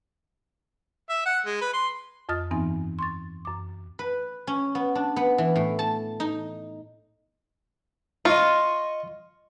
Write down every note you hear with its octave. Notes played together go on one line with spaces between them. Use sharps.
E5
F#5
G#3
B4
C6
F2 F4 D#5 D#6 F6 A6
G2 E3 B3 C4 D#4 G#5
C6 C#6 A6
F#2 D6
B4
C#4
B3
D4
B3
E3
A2
A5
D#4
F4 D#5 C#6